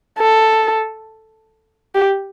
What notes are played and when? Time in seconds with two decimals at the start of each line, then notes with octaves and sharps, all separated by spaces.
0.18 A4
1.95 G4